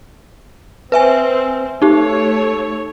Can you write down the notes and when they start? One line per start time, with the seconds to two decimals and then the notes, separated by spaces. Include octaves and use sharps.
0.92 C4 B4 E5 G#5
1.82 A3 D#4 G4 C#5